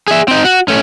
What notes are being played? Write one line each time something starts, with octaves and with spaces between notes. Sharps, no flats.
G#4 E5
C4 D#4
F#4
A3 C#4